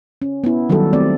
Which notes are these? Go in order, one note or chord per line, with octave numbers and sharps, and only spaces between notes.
C#4
B3 E4
D#3 F#3 G3 F#4 A4
A3 C4 D5